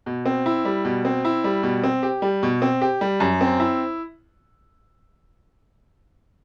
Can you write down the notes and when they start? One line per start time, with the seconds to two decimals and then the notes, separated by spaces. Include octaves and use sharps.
0.06 B2
0.26 C4
0.46 E4
0.65 G3
0.85 B2
1.05 C4
1.25 E4
1.44 G3
1.63 B2
1.84 C4
2.03 G4
2.22 G3
2.43 B2
2.62 C4
2.81 G4
3.01 G3
3.20 F#2
3.41 C4
3.60 E4